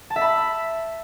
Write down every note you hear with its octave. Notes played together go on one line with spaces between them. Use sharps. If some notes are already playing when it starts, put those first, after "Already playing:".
A5
E5
B5